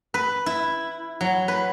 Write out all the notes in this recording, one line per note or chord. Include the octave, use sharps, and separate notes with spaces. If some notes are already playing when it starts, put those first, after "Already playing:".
B4
E4
F#3
B4